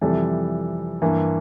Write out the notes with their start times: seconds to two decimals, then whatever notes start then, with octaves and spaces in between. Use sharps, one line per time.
0.01 F2 C3 E3 G3 A4
1.02 G2 E3 A#3